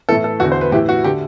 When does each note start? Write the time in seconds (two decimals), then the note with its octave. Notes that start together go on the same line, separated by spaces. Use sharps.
0.09 A2 E3 A4
0.24 A4
0.40 E2 D3 F#4
0.52 C5
0.61 B4
0.72 A2 E3 G4
0.89 F#4
1.04 D3 G4